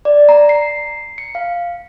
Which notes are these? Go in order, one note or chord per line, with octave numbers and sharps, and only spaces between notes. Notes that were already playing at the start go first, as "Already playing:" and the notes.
D5
A#5
C7
C#7
F5